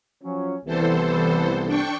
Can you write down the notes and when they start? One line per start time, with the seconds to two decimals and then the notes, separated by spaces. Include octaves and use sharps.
0.23 F3 F#3 C#4
0.65 C2 E3 B3 A4 C5
1.66 D4 G5 C#6